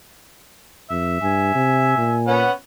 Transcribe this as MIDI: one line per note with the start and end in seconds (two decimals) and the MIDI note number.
0.91 1.22 41
0.91 2.20 76
1.22 1.52 43
1.22 2.34 80
1.55 1.96 48
1.97 2.46 46
2.27 2.52 59
2.27 2.52 61
2.27 2.52 78